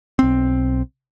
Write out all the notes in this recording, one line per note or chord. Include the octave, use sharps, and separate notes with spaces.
B1 C4